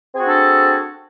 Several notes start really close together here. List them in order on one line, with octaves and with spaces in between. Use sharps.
C4 G#4 F#4 D4 A4